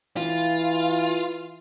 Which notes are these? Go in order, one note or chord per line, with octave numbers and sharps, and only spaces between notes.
E3 F4